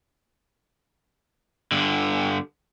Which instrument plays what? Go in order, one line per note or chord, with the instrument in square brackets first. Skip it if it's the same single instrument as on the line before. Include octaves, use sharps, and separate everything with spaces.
[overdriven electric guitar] G2 D3